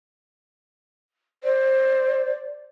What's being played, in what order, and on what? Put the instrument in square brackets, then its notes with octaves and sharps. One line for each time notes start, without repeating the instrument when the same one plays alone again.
[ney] C5 [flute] D5